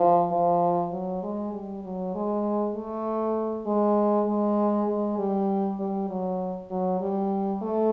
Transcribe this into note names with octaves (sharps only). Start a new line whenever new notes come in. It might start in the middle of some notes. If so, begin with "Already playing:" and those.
Already playing: F3
F3
F#3
G#3
G3
F#3
G#3
A3
G#3
G#3
G#3
G3
G3
F#3
F#3
G3
A3